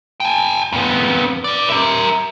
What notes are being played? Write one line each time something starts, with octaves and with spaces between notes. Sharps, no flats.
G5 G#5
F2 B3
B4 D5
A#4 E5